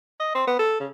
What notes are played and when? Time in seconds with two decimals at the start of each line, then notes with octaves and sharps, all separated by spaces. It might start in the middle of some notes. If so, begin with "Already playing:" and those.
0.20 D#5
0.35 C4
0.47 B3
0.59 A4
0.80 C#3